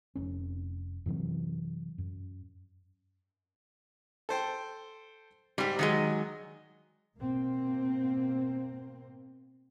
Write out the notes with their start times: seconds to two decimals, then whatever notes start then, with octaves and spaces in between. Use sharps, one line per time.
0.15 F1 C#4
1.06 F#2 C3 E3 F#3
1.98 F#2
4.29 A4 C5 G5
5.58 G#2 G3 G4
5.79 D#3 F#3 G#3 D#5
7.18 B2 A#3 C4